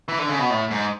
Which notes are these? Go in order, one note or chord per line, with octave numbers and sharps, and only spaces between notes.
E3
D3
C#3
B2
A2
G#2